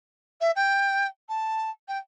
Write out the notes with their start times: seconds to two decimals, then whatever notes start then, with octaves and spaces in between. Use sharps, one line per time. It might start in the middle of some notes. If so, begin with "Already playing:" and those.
0.40 E5
0.55 G5
1.28 A5
1.88 G5